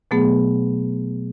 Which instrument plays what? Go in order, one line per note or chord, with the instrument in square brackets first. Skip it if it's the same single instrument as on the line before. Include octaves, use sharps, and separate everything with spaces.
[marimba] B2 F#3 A3 B3 G#4